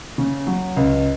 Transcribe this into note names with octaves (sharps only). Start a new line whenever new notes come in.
C#3
F#3
C#2